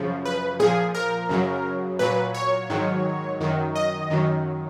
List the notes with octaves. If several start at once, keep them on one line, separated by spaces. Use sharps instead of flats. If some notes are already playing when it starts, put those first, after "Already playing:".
Already playing: F#2 C#3 F3
B4
A#2 F3 G#4
A#4
F#2 C#3 F#3
A#2 F#3 B4
C#5
G#2 D#3 F#3
F#2 D#3 F#3
D#5
F#2 D#3 F#3